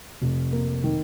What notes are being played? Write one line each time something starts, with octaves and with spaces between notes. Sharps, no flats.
F1
A#3
D#3